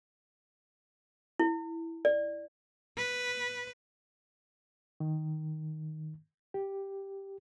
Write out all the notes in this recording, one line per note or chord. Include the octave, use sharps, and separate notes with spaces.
E4
D5
B4
D#3
G4